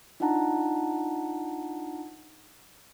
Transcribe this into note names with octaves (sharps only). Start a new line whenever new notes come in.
D4 D#4 F4 F#5 A5 A#5